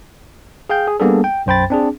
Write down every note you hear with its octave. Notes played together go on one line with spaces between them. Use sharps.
G#4 F5 G5 G6
G#4
G3 A#3 B3 D4 G#4 A4
G5
B1 F#2 C5 G5 B5 A6
C4 D4 G#4